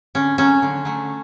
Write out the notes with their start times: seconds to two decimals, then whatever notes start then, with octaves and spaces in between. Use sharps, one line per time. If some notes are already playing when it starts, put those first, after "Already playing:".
0.15 D3 C#4
0.38 F#3 A3 C#4
0.62 D3
0.85 F#3 A3